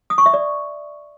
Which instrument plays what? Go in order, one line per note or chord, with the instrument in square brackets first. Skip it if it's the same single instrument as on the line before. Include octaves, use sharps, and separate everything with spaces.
[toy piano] D#6
C#6
E5
D5